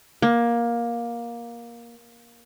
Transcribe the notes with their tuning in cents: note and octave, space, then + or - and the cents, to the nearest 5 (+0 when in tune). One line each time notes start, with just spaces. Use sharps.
A#3 +15